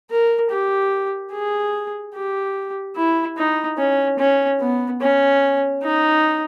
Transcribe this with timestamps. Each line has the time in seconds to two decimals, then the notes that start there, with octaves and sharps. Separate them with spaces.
0.11 A#4
0.51 G4
1.33 G#4
2.15 G4
2.96 E4
3.38 D#4
3.79 C#4
4.19 C#4
4.61 B3
5.01 C#4
5.84 D#4